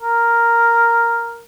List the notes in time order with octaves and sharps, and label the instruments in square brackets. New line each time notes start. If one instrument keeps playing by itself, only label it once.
[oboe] A#4